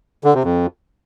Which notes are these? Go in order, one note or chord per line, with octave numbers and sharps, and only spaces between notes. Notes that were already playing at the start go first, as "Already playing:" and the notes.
D3
C3
F2